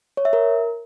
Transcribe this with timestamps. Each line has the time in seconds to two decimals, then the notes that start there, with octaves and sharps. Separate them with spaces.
0.17 C#5
0.25 E5
0.33 A#4